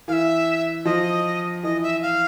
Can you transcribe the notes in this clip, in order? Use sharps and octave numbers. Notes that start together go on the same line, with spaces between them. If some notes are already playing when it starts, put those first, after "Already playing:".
E3 F5
E5
F3 D#5
E3 D#5
E5
F5